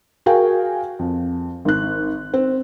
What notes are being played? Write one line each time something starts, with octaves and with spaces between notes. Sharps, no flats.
F#4 G#4 A#4 F5 G5 G#5
F2
G#1 F#6
C4